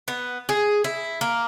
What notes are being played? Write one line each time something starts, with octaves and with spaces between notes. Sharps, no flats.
B3
G#4
E4
A#3